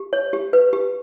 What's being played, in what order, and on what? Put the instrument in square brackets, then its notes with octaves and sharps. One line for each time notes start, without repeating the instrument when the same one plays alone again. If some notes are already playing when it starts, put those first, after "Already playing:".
Already playing: [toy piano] G4
C#5
G4
B4
G4